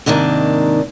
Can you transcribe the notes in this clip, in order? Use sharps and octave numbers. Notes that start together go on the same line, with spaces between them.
G#2 C3 D#3 A#3 D4